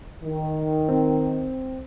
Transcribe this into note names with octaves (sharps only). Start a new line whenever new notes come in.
D#3
C4